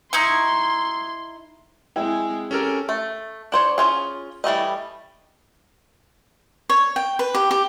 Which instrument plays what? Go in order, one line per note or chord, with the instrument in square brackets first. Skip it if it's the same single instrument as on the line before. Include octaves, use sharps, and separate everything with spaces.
[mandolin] D#4 E4 C#6 [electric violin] C6
[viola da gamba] G#3 C4 G#4 [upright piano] E4 G5
[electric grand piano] C#4 A4 A#4 [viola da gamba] G4
[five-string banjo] A3
D4 C5 C#5
C#4 F4 G#4
E3 G3 A3 D#5
[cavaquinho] C#5
G5
B4
G4
G4